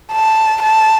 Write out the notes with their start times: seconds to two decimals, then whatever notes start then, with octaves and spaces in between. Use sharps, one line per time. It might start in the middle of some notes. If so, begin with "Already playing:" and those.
0.12 A5
0.62 A5